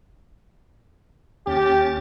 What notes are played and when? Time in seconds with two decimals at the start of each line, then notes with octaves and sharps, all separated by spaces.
1.47 D#2 C#4 G4 A6